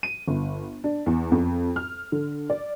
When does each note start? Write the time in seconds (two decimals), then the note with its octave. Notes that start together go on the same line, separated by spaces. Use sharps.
0.03 D#7
0.28 G1
0.84 D4
1.06 E2
1.32 F2
1.76 F6
2.12 D3
2.50 D5